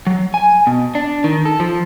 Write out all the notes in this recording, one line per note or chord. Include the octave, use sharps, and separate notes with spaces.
F#3
G#5
B2
D4
D#3
A4
F3